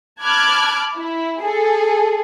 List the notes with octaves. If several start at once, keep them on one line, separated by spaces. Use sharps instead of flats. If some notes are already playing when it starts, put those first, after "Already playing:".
A5 B5 D6 F6 F#6 G#6
E4
G#4 A4